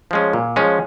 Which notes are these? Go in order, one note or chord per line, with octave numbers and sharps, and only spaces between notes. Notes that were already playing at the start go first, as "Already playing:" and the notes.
F3 G#3 C#4
A#2
F3 G#3 C#4